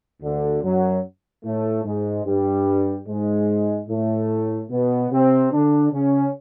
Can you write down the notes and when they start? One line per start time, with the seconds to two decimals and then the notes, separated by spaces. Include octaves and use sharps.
0.22 D2 D3
0.63 F#2 F#3
1.44 A2 A3
1.85 G#2 G#3
2.26 G2 G3
3.07 G#2 G#3
3.88 A2 A3
4.70 B2 B3
5.11 C3 C4
5.51 D3 D4
5.92 C#3 C#4